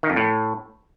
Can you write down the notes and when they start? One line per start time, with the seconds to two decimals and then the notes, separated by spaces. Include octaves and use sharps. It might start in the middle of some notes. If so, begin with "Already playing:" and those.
0.03 D#3
0.10 F2
0.16 A2